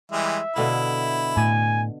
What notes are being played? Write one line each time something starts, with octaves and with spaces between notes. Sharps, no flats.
E3 G3 G#3 E5
B2 D3 E4 F5
A2 G#5